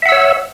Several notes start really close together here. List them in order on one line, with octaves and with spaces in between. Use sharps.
E5 F#5 E6 C#5